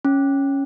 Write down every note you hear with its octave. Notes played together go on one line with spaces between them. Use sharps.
C#4